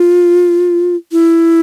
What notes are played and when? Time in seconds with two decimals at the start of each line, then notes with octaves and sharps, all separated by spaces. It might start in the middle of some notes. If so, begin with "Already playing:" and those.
Already playing: F4
1.12 E4